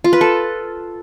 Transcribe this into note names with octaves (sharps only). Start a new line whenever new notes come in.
F4
B4
A4